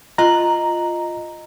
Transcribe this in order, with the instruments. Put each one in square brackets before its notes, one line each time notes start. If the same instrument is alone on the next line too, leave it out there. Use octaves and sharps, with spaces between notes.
[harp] F4 F#6 [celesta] D#5 [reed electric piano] A#5